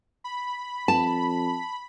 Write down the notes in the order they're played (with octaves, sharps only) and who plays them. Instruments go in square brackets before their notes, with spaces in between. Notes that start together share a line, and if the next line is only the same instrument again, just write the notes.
[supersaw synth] B5
[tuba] F2 [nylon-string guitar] A5